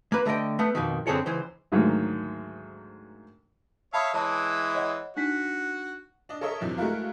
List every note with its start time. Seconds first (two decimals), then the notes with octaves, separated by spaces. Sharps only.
0.12 A#3 B4
0.25 D3 A3 A#4 D#5 G5
0.59 A3 B3
0.75 F2 B2 D#3
1.07 F#2 D3 C4 G#4 A4 C#5
1.26 C#2 E3 C5
1.72 D2 G#2 D#3 F#3 A#3
3.93 C#5 E5 F5 A5 B5 D#6
4.14 E3 G#3 E4 C#5 A5
4.75 C#5 D#5 F#5
5.17 D4 D#4 F#4 B6
6.29 D4 D#5
6.41 A4 A#4 C#5 D#5 E5
6.61 E2 C3 F3 F#3
6.78 G#3 A3 E4 F#4 A#4 F5